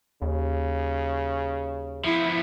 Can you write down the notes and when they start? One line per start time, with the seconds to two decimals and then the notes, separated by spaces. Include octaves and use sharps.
0.22 D#2 C#3
2.05 F3 B3 E4